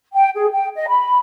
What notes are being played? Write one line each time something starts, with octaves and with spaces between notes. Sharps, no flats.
G5
G#4
G5
D#5
B5